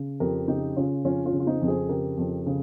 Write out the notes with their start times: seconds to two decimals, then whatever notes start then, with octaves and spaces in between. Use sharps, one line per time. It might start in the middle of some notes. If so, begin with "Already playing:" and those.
Already playing: C#3
0.20 F2 G4 A#4
0.48 C#3 D#4 G4
0.76 C#3 C#4 F4
1.04 F2 C#4 F4
1.25 C#4 F4
1.33 C#3
1.40 F4
1.47 C4 D#4
1.62 F2
1.68 G#4 C5
1.89 C#3 G4 A#4
2.18 F2
2.46 C#3